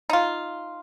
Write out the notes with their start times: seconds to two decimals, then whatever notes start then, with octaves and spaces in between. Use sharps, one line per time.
0.10 D#4 F4